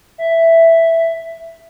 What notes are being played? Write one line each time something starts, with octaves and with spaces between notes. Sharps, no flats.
E5